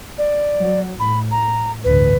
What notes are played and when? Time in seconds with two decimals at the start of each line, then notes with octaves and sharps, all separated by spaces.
0.18 D5
0.59 F#3
1.00 A2 B5
1.31 A#5
1.84 A1 D2 G2 B4